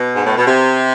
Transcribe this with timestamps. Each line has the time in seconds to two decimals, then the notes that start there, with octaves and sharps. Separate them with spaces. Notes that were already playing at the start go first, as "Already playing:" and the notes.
Already playing: B2
0.15 G#2
0.25 A2
0.36 B2
0.47 C3